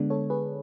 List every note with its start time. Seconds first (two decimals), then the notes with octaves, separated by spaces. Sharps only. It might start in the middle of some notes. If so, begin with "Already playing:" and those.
Already playing: D3 G#3 B3 D4
0.10 A4 C#5
0.30 G#4 B4